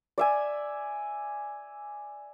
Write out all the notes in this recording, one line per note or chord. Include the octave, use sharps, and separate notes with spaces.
D5 E5 G#5